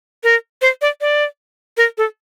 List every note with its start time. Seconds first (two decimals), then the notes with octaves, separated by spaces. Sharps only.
0.24 A#4
0.62 C5
0.82 D5
1.01 D5
1.77 A#4
1.98 A4